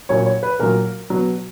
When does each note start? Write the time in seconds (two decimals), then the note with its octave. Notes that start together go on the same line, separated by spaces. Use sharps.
0.09 A#2 F#3 C#5
0.26 C#5
0.43 B4
0.60 A#2 F#3 A#4
1.10 B2 F#3